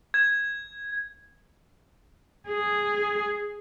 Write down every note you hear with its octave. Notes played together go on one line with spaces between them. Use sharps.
G#6
G#4